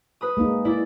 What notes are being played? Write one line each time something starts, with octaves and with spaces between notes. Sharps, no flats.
B4 B5 D#6
G#3 A#3 D#4
E4 D5